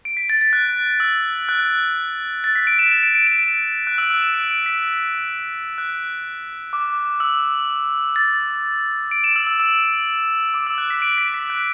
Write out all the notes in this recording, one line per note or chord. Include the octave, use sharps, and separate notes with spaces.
D7
B6
A6
A6
F#6
E6
F#6
A6
B6
D7
E7
E7
D7
D7
E7
D7
F#6
E6
E6
E7
D7
D7
B6
F#6
D6
E6
A6
D7
E7
E6
E6
E6
D6
E6
F#6
B6
D7
B6
B6
F#6